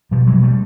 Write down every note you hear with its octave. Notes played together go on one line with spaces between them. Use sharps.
B2 F3 G3
F#3 G#3
B2
G3 A3